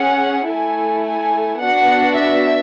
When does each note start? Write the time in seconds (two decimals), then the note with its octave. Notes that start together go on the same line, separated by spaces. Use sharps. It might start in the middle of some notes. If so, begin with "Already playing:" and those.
Already playing: C#4 G#4 F#5
0.50 A3 E4 A4 G#5
1.05 G#5
1.61 B3 D4 F#4 F#5
2.17 E5